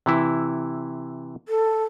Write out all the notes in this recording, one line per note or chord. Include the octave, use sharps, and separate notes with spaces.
C3 E3 E4
A4